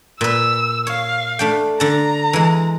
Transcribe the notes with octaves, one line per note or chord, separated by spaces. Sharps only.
A#2 B4 E6
C#5 F5
A3 D4 G5
D3 A5 A#5
E3 G#3